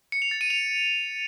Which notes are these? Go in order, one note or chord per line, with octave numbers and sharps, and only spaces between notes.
C#7
F7
A6
D#7
F7